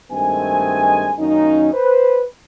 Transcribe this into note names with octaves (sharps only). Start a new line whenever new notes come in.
G2 D#3 G#3 A3 C4 G#5
F#2 D#3 A#3 C#4 D#4
B4 C5